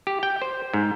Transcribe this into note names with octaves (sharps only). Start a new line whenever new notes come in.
G4
G5
C5
G#2